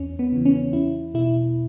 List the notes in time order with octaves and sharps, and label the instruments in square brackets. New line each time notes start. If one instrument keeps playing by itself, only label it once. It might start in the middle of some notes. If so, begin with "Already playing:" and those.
Already playing: [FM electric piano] E2 C#4
B3
C#3 E3
C#4
E2 E4
B2 E4